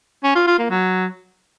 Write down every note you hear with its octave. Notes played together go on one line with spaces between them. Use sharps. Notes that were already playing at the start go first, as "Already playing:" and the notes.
C#4
F4
F4
A#3
F#3